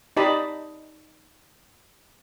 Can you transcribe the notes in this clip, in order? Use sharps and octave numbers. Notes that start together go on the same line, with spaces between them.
D#4 G4 D5 D#5 A5 B5